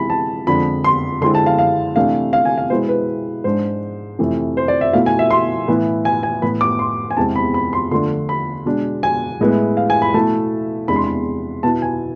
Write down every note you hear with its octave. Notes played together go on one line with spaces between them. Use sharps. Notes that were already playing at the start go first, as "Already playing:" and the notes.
Already playing: C3 E3 G#3 B5
A5
F2 D3 F3 G#3 D4 B5
C6
D3 G#3 C4 E4 C6
A5
F5
F5
C3 E3 A3 D4 F5
F5
G#5
F5
B2 G#3 B3 E4 C5
B4
G#2 G#3 D4 C5
F2 C3 E3 A3
C5
D5
E5
B2 A3 E4 F5
G#5
E5
C6
A2 E3 B3 E4
G#5
G#5
A2 E3 B3 B5
D6
C6
G#5
E2 C3 G#3 C4 A5
B5
B5
C6
D3 F3 A3 D4 C6
B5
B2 G#3 D4
G#5
A2 G#3 B3 E4
F5
G#5
B5
B2 A3 E4 A5
E2 C3 G#3 D4 B5
C6
B5
B2 B3 E4 A5
G#5